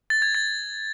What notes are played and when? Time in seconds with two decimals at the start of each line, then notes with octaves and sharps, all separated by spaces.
0.10 A6
0.22 G#6
0.35 A6